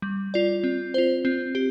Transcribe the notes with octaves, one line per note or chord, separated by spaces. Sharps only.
G3
F4 D5
C4
F4 C5
C4
G4